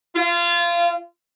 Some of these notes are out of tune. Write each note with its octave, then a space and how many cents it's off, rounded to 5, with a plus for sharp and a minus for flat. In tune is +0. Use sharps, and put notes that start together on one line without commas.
F4 -25